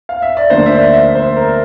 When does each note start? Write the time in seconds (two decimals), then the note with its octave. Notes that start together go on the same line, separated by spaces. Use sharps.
0.09 F5
0.22 E5
0.37 D5
0.50 D2 D3 F3 A#3 D4 C5
0.66 E5
0.71 D5
0.93 E5
1.15 C5
1.36 A#4